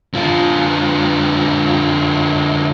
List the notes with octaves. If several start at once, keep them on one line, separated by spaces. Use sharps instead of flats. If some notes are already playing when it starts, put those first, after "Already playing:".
D3 F4